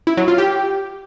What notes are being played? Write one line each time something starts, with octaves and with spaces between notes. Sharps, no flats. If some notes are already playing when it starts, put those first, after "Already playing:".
E4
F#3
F4
G4